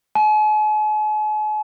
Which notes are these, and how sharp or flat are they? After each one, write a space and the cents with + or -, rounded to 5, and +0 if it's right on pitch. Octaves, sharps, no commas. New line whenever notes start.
G#5 +45